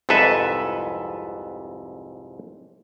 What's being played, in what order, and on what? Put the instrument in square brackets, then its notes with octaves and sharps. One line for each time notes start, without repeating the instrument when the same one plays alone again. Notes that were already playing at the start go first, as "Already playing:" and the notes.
[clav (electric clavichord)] C2 F2 G#2 A4 B4 E5